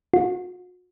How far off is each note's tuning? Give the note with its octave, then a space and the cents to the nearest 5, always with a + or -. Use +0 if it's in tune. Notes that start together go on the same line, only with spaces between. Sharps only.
F#4 -40